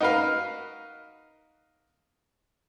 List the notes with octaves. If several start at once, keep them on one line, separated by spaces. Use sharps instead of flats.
D#4 F#4 A#4 B4 F5